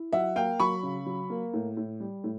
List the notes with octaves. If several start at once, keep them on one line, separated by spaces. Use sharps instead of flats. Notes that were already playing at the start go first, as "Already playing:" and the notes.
Already playing: E4
F#3 E5 F#5
A#3 F5 G5
F#3 B5 C#6
C#3
F#3
A#3
A2
A2
G3
A2